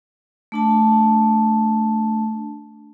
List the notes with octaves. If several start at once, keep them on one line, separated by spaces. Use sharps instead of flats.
A3 D4 A5